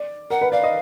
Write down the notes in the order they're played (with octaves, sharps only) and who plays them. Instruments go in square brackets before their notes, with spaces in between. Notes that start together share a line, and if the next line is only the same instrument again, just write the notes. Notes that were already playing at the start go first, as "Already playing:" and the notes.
Already playing: [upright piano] D5
[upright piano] A#4 [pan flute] F#5
[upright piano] B4
[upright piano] D5 [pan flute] F5
[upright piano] D#5